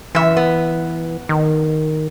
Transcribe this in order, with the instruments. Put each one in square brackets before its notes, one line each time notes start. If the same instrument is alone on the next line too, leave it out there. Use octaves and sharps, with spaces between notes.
[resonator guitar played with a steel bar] F#2 E5 [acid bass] E3
[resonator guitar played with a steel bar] B3
[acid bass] D#3